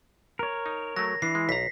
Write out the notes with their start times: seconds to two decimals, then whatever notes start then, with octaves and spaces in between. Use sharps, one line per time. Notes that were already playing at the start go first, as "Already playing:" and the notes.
0.39 A#4 C#5
0.66 D#4
0.96 F#3 A3 A#6
1.22 E3 D4 C7
1.35 G#3
1.49 B1 A#5 B6